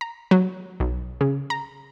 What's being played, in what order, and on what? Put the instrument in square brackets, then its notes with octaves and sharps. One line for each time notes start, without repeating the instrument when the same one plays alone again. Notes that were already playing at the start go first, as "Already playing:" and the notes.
[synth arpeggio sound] A#5
F#3
B1
C#3
A#5